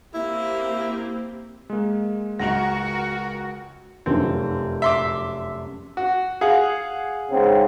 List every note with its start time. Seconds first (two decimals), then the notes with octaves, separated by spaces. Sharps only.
0.14 A#3 C4 E4 G4
1.70 G#3 A#3
2.39 C#2 F#4 A#4 F#5 A#6
4.06 F1 F#2 C4
4.82 E5 C6 D6
5.97 F#4
6.41 G#4 F5 F#5
7.30 G#2 C#3 C4